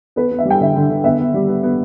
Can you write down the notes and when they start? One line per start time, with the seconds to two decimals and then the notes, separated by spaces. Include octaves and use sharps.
0.16 B3 B4
0.31 B3
0.39 E5
0.45 G3
0.50 G5
0.61 D3 E5
0.76 D3
0.90 D3
1.04 B3 E5
1.20 B3
1.34 G3
1.48 B3
1.63 B3